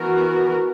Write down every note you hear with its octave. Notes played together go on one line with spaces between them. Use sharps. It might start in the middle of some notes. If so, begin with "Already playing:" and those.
Already playing: E3 B3 F#4 A#4